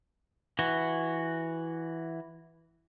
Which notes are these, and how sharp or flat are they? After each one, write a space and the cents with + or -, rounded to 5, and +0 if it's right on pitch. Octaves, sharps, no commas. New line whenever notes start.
E3 +0 F#4 +0